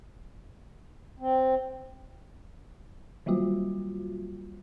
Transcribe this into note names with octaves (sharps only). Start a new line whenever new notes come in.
C4
D#3 F#3 G3 A#3 F4 F#4